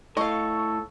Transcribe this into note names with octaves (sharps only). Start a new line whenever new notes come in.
A2 A4 D#5 F5 C#6